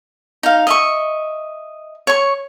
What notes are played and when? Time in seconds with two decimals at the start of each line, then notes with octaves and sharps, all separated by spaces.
0.43 D#4 F5
0.67 D#5 E5 C#6
2.07 C#5 C#6